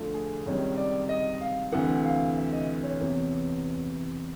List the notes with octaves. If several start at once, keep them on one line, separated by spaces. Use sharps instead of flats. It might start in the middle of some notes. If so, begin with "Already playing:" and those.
Already playing: D2 D3 F3 A3
G#4
C#2 C3 D#3 G3 C#5
D5
D#5
F5
D2 C3 E3 F#5
F5
E5
D#5
C#5
E2 C3 E3